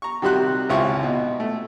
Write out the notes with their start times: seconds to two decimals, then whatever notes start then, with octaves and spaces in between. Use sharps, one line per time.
0.02 A#5 C#6
0.22 C3 D#3 G3 F#4 C6 F#6
0.69 G#1 C#2 C4 E4 F4 C#6
1.03 B2
1.40 A3